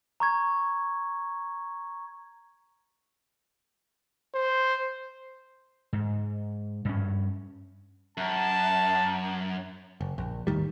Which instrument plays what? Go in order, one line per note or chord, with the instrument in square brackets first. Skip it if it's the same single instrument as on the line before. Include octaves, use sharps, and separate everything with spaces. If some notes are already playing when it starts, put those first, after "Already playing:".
[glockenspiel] A#5 C#6 G#6
[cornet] C5
[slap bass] G#2
G2 C#4
[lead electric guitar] F#2 [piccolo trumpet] A5
[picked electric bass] F#1
A#1
D#2 A2 D#3 G3